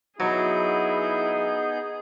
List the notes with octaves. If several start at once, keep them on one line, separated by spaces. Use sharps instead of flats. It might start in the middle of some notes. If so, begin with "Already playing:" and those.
F#3 B3 D#4 E4 G#4 G6